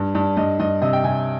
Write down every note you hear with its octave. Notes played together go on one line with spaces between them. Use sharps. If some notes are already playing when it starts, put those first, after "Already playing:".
Already playing: G2
G2
G2 D#5
G2 D#5
C3 D#5
G5
C3 G#5